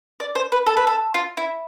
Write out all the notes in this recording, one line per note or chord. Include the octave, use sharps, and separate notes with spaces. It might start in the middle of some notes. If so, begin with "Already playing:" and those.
D5
C5
B4
A4
B4
A4
F4
E4